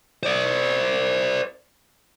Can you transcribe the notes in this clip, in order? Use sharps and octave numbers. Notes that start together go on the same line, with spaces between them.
C5 D5